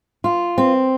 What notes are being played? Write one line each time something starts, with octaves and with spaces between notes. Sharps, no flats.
F4
C4